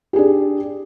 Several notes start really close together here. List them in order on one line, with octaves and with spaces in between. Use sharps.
G4 G#4 D4